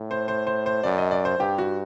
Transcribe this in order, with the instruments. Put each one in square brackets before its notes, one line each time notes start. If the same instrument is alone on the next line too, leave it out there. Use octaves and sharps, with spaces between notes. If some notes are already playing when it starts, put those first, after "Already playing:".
Already playing: [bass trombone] A2
[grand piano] C5
C5
C5
C5
[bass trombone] F#2 [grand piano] D5
[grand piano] D#5
D5
C5
[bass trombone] G2 [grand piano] G4
[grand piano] F#4